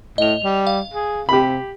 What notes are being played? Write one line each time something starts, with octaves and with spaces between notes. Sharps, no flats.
A2 D#5 F7
G3
F5
G#4
C3 G4 B5